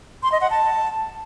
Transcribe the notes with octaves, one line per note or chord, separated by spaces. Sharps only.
C6
D#5
F#5
A5